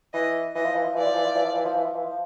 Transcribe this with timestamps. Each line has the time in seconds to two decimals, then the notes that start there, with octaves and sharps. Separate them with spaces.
0.13 E3 D#5
0.55 E3 D#5
0.65 F3
0.75 E3
0.85 F3
0.95 E3 D5
1.06 F3
1.15 E3
1.25 F3
1.35 E3
1.45 F3
1.55 E3
1.65 F3
1.75 E3
1.85 F3
1.95 E3
2.05 F3